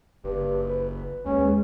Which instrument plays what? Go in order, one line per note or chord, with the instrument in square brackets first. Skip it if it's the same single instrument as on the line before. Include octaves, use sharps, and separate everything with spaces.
[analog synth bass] F#1 [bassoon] G2
[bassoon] B4
[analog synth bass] D#2 [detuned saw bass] G#3 [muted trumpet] C#4